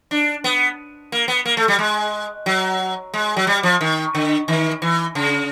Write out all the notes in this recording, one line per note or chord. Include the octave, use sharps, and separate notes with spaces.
D4
B3
A#3
B3
A#3
A3
G3
G#3
F#3
G#3
F#3
G3
F3
D#3
D3
D#3
E3
C#3